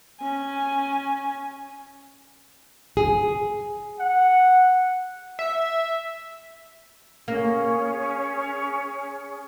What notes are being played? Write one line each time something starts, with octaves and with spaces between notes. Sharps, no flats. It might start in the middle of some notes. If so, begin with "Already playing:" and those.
C#4 G#5
G#4
F#5
E5
A#3 C#4 G#4